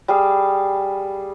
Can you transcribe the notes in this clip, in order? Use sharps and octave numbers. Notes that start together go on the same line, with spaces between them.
G3 G#4 F5